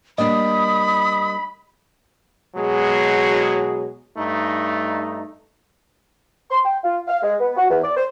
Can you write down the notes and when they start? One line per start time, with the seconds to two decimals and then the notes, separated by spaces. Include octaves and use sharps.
0.18 G3 A#3 D4 D#5 B5 D#6
2.55 B2 F#3 G#3 G#4
4.17 G2 A3 D#4
6.50 C6
6.63 G5
6.83 F4
7.08 F5
7.23 G#3
7.40 B3
7.57 F#4
7.70 E2
7.83 D5
7.97 C5